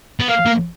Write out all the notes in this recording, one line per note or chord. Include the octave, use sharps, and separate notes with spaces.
B3
A#3 F5
A#3